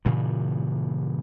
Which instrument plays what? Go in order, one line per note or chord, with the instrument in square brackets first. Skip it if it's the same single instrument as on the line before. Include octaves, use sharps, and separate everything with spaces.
[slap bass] G2 A#2 C#3 E3